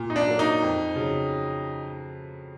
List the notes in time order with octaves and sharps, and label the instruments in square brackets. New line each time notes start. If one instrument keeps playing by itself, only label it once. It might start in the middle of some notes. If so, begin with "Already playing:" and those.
Already playing: [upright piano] A#2
[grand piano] D#4
D4
[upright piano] F#3 A#3
[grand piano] D#4
[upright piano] F2
C#3 F#3